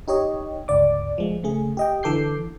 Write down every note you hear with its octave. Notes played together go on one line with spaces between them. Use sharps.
D#4 G4 C#5 D#5
G1 C#2 D5 D6
F3 G#3
C#3 A3 G#4
G4 D#5 G5
D3 E3 A4 D6 G6 C7